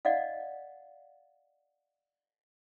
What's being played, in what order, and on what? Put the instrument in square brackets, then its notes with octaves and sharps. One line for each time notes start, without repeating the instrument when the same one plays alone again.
[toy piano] D5 D#5 F5 F#5